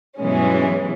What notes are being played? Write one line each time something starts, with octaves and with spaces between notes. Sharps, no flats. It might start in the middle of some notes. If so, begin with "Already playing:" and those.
G2 B2 E3 F#3 G#3 C#4